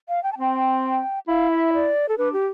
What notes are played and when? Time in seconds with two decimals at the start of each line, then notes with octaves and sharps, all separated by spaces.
0.09 F5
0.23 G5
0.33 A5
0.38 C4 G5
1.28 E4 F5
1.51 E5
1.73 D5
2.09 A4
2.18 D4 B4
2.33 G4